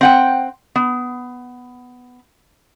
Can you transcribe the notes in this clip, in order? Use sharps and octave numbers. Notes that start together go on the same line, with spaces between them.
C4 F#5 G5
B3